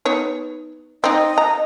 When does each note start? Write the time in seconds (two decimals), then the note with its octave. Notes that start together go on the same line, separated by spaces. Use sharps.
0.05 B3 D#4 C#5
1.04 C4 D#4 D#5
1.38 A#5